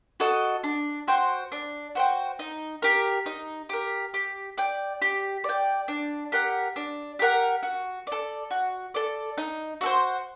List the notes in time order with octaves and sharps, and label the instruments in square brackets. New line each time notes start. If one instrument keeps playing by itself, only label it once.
[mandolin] F#4 A4 D#5
D4
F#4 C5 G5
D4
F#4 C5 G5
D#4
G4 A#4
D#4
G4 A#4
G4
D5 G5
G4
D5 G5
D4
G4 A#4 F#5
D4
G4 A#4 F#5
F#4
A4 D5
F#4
A4 D5
D#4
F#4 A4 C5